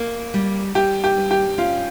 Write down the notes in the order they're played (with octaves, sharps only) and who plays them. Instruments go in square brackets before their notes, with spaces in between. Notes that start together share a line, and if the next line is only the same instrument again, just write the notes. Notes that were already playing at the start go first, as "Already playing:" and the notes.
Already playing: [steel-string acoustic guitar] A#3
G3
[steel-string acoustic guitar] G3 [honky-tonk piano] G4
[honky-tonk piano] G4
[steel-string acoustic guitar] G2
[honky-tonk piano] G4
[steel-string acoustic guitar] C#4 [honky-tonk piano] F4